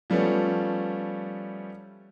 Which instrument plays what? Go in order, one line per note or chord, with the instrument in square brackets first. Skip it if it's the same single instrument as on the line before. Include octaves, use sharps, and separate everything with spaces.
[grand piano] F3 G3 A3 B3 C#4